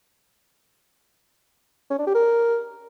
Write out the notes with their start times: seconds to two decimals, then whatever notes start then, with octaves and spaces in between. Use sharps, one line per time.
1.91 C#4
1.99 D4
2.07 G4
2.15 A#4